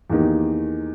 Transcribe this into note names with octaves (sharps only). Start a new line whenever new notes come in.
E2 D#3 A#3 D#4 G4